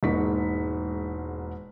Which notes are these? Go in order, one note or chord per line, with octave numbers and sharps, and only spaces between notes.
E1 G#2 A#3 D#4 C#6 B6